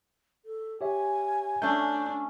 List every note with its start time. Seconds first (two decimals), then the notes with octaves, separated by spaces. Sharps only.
0.45 A4
0.81 G4 C#5 E5 G#5
1.62 A3 C#4 D4 G6